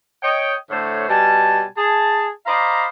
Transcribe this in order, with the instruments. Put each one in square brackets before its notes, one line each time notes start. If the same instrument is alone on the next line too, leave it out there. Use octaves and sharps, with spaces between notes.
[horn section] C#5 D#5 G5
A2 D3 A3 C5 C#5
B2 G3 G#5 A5
G#4 A5
C5 D5 D#5 F5 A#5 B5